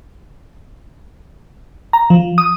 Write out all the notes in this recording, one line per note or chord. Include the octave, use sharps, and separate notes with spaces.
A#5
F3
D#6